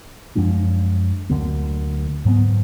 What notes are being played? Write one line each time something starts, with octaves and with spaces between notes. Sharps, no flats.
F#2 F3 G#3 D4
D2 D3 F#3 A#3
G#2 F#3 B3